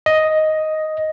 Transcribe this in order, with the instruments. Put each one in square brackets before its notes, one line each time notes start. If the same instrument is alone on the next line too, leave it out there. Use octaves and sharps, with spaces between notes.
[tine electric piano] D#5